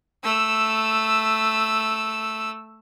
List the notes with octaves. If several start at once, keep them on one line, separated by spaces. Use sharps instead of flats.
A3 E6